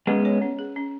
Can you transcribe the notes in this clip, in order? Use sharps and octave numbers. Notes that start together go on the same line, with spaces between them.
G#3 B3 C#4
C#5
C#4
G#4
C#4